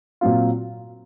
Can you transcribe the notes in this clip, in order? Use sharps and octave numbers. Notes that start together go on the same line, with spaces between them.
A#2 F#3 C4 F4